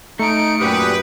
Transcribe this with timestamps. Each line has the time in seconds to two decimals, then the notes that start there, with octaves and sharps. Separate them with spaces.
0.19 A3 D#4 C#7 D7
0.60 F#2 A#2 G4 B4 D#6